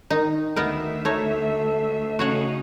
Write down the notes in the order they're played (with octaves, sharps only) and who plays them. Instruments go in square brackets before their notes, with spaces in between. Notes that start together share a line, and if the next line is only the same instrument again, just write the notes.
[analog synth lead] D#3 [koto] D#4
[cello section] D2 E5 [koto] B3 D#4 A#4
[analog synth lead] A3 [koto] D#4 C#5
[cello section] C#3 C#4 D#4 [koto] F#4 C#5 F#5